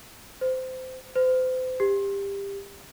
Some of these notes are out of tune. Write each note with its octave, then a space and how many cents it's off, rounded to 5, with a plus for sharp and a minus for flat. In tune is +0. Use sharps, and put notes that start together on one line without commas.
C5 -20
C5 -35
G4 +20